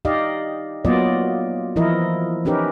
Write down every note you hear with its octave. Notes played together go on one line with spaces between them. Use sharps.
D#4 G4 D5 D#5 F5
F#3 A#3 B3 F4 D5 D#5
E3 F3 E4 A#4 D#5
C#4 D#4 G4 A#4 B4